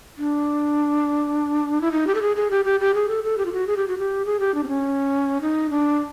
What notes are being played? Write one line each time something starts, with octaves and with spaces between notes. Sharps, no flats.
D4
E4
D#4
G4
A4
G#4
G#4
G4
G4
G4
G#4
A4
A4
G4
F4
F#4
G#4
G4
F#4
G4
G#4
G4
D4
C4
C#4
D#4
D4